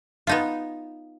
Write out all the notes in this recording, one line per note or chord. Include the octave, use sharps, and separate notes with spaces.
B3 D#4 F4